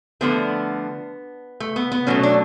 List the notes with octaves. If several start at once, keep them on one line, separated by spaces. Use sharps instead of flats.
D3 F3 A3 B3
A3
B3
B3
B2 F#3 A3 C#4
D4